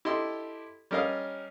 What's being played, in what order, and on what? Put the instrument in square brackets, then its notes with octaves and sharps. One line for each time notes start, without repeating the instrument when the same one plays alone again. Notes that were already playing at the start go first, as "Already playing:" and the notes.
[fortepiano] E4 G4 A4 D#5 C6
G3 C#4 A#4 D#5 F5